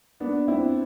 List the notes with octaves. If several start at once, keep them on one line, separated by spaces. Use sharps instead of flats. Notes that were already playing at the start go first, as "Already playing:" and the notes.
B3 D4
C4 E4